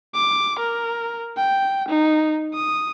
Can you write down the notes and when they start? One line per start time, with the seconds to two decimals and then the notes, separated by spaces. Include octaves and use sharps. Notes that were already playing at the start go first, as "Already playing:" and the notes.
0.14 D6
0.59 A#4
1.37 G5
1.89 D#4
2.54 D#6